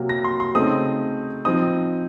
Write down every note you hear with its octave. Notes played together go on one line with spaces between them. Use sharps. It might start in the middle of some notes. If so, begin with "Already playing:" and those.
Already playing: C3 F#3 A#3
A#6
C6
C6
C#3 A3 C4 D#4 D#6
F3 C4 D#4 D#6